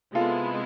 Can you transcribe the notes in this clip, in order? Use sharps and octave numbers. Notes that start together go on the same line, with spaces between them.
C3 G#3 B3 E4 F4 A4